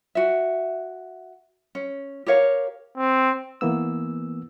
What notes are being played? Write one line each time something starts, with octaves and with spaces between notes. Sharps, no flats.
F#4 E5
C#4
G4 A#4 C#5 F5
C4
E3 A#3 B3 E6